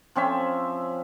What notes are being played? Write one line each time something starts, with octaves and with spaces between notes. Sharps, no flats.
F3 C4 C#4 E5